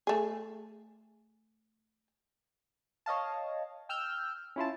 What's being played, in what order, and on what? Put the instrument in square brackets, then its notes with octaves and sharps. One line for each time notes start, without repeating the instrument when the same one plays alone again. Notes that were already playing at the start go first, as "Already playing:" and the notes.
[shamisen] A3 G#4
[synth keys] C#5 D#5 F5 A5
G5 E6 F6 G6
C#4 E4 F4 A5